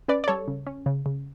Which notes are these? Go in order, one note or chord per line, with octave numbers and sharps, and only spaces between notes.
C#4 B4 D5
D5
G3 A4 C#5
C#3
C#4
C#3
C#3